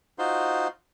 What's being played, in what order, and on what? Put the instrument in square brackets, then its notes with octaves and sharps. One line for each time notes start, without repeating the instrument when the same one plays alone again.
[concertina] D#4 F4 F#4 C5 C6